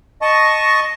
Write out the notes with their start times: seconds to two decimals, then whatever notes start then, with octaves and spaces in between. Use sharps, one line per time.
0.22 D#5 A5 C#6